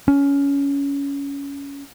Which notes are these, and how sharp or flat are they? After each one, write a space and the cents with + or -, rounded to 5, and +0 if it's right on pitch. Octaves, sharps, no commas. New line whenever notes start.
C#4 +20